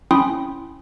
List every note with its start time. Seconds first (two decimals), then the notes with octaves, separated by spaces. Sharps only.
0.11 C#4 E4 G5 B5 C6 D#6